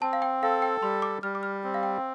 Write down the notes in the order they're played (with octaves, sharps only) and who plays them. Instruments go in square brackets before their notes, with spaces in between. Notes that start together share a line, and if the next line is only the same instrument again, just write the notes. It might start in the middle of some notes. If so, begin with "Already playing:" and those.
[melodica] C4 [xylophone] A5
[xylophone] F5
G5
[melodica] A4 [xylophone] F5
[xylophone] G5
[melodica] G3 [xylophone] C6
[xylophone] D6
[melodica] G3 [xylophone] F6
[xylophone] D6
F6
[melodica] C4
[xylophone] F5
G5